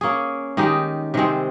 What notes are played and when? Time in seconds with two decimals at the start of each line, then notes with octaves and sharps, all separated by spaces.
0.01 A#3 C#4 G#4
0.57 D#3 G#3 D#4 G4
1.14 C3 D#3 G#3 C4